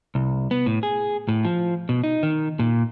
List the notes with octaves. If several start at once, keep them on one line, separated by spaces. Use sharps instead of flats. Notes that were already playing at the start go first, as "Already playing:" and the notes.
C2
B3
A2
G#4
A2
F3
B2
D#4
D#3
A#2